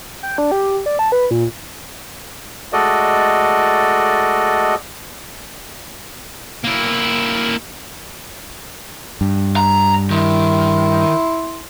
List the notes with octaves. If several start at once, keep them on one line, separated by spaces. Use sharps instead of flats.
G5
D4
G4
D5
A5
B4
A#2
G#3 A3 F#4 A4 D5 D#5
A#3 E4
G2
A#5
D#3 E4 C6